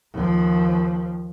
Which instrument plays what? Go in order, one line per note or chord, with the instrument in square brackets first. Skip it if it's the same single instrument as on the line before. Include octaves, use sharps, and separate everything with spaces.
[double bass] D#2 F3